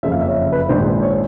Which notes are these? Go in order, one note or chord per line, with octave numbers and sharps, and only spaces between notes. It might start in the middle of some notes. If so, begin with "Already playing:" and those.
F#1 F2 C#3 F3 E5
F5
E5
C#5
B4
A#1 G#2 D#3 C5
C#5